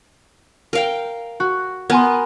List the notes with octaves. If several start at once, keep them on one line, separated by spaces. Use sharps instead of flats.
A#4 F5 G5
F#4
B3 A#4 G#5 C6